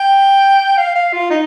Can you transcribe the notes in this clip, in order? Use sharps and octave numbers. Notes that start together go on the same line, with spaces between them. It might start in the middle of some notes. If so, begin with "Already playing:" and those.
Already playing: G5
F5
F5
F4
D#4